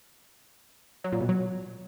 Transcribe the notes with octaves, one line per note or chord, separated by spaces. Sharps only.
F#3
A#2
B2
F#3